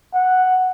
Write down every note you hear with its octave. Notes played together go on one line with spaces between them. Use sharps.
F#5